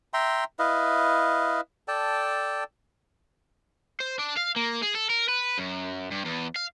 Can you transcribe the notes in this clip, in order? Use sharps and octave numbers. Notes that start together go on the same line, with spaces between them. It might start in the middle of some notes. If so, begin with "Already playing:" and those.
E5 G5 A#5 C6
E4 B4 D#5 F5
A4 D5 G5 A5
C5
D4
F5
A#3
G#4
A4
A#4
B4
F#2
G2
E2
F5